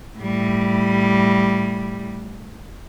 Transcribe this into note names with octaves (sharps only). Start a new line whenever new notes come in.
A2 G3